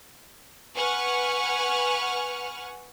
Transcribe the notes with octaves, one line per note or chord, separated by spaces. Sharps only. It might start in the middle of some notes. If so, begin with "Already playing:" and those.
B4 F#5 G#5 C#6 F6